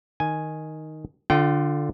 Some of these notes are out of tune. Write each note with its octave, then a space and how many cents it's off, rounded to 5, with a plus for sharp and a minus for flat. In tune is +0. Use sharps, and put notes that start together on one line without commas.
D#3 +0 G#5 +0
D3 +5 F4 +15 G5 -30